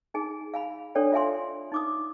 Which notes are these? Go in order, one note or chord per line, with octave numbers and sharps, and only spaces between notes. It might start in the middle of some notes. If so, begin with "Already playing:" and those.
D#4 G#4 G#5
F5 G#5 B5
D4 A4 C#5 D5 G5
F4 E5 F5 G#5 C6
D#4 D6 D#6